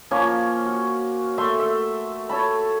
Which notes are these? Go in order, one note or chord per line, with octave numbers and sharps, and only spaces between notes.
F3 A#3 C#4 C#5
F#4
A3 E5 C6
E5
A4 C#5 A5 B5